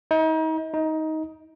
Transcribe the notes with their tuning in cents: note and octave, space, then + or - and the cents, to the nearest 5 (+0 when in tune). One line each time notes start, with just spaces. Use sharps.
D#4 +35
D#4 +15